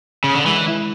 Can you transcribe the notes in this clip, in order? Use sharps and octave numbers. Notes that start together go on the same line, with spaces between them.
C#3
D3
E3 G#3
E4